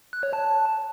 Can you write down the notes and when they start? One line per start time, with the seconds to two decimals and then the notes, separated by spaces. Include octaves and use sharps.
0.13 F#6
0.23 C#5
0.33 A5